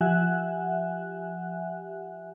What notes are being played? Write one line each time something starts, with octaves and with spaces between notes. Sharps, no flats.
F3 G4 E5 F#5 G#5 F#6